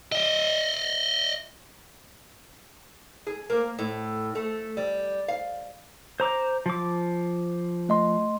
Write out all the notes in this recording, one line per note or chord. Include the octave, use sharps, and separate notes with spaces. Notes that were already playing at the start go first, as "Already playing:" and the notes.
D#5 E5
G#4
A#3
A2
A3
G3
F5
C5 A#5 D6
F3 D6
A3 D#5 C6